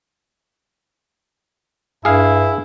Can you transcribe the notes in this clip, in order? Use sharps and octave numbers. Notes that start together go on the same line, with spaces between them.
G2 E4 G#4 F5